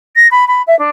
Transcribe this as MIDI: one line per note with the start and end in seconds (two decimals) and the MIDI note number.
0.16 0.27 94
0.31 0.47 83
0.48 0.62 83
0.67 0.77 76
0.79 0.90 62